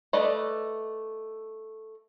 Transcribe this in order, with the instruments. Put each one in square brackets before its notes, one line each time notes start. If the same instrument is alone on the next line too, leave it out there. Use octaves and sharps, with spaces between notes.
[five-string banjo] A3 B4 D5 D#5